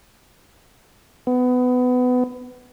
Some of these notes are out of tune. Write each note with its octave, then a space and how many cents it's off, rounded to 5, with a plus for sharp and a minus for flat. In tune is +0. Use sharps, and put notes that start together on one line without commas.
B3 +20